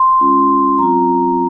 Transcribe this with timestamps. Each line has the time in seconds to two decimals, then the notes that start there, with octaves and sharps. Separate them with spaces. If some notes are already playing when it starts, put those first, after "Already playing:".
Already playing: C6
0.20 G#3 C#4 F4
0.78 F#3 C4 F4 A#5